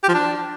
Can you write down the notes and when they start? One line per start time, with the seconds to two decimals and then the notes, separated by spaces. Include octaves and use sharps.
0.03 G4
0.09 F3
0.14 D4